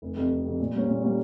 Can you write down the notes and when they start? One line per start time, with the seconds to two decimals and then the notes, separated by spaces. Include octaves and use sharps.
0.02 F1
0.16 F2 C3
0.31 F1
0.45 F2 C3
0.59 A#2
0.74 G3 A#3 C#4
0.88 A#2
1.03 G3 A#3 C#4